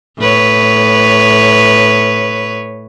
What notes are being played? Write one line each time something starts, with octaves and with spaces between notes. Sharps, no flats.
A2 B4 C#5